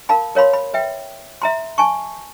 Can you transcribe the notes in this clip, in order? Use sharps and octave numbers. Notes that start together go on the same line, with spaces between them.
A#4 F5 A5 B5
A#4 C#5 F5 B5 C6
B5
B4 E5 G5
E5 A#5 C6
G#5 A5 C#6